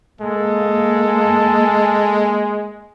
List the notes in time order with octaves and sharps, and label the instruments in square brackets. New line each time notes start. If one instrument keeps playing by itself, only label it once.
[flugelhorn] G#3 [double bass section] A#3 [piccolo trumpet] A4